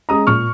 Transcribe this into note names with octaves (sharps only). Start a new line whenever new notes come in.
G#3 C#4 A#5 D#6
A#2 C#6 F6